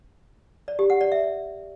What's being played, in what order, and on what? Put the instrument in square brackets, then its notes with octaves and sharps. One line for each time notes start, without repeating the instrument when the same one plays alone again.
[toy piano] D5
G4
F#5
D5
E5